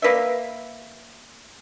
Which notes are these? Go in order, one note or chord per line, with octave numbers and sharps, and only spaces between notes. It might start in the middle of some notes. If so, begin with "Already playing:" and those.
A#3 B4 D5 E5